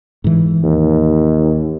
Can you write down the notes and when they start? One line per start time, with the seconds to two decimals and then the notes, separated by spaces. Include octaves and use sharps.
0.24 G#2 E3
0.64 D#2